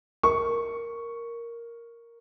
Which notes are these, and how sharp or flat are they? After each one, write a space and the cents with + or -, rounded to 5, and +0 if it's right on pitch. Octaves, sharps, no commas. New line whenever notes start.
A#4 +0 C#6 +0